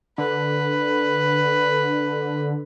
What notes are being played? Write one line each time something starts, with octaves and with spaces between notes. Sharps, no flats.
D3 B4